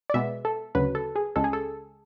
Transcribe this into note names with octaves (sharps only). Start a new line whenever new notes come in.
D5
B2 G#3 B3 E5
A4
D2 C#3 F#3 B4
A4
G#4
C#2 C#3 G#3 A4
G#4
A4